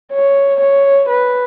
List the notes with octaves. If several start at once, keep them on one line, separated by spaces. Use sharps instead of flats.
C#5
C#5
B4